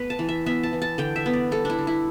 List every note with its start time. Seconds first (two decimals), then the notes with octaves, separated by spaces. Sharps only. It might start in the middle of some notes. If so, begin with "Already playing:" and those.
Already playing: A3 B3 B4
0.10 A5
0.19 E3
0.29 E5
0.46 B3 E5
0.63 A5
0.73 E3
0.82 A5
0.98 D3 G5
1.16 E5
1.26 B3
1.33 D5
1.52 G3 A4
1.65 D4 E4
1.79 D3
1.87 E4